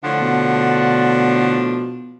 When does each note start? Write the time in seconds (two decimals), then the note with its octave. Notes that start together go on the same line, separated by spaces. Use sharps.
0.03 A2 D3 F3 D4 F#5
0.21 B2